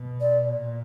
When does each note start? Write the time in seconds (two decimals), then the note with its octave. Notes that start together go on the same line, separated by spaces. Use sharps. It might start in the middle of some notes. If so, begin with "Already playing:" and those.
Already playing: B2
0.20 D5
0.49 A#2